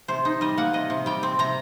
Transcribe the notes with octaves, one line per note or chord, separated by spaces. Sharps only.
C3 C5
D#4
G3 D#5
A#3 F#5
C3 D#5
C3
G3 G5
C4
C3 A#5